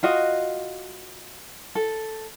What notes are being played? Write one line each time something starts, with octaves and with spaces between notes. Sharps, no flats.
F4 F#4 D#5
A4